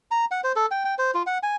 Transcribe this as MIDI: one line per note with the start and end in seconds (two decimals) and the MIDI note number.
0.11 0.25 82
0.31 0.41 78
0.44 0.52 72
0.56 0.66 69
0.71 0.84 79
0.85 0.95 79
0.98 1.11 72
1.14 1.23 65
1.27 1.38 78
1.43 1.56 80